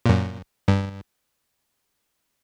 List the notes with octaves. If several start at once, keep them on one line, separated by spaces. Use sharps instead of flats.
F#2 A#2
G2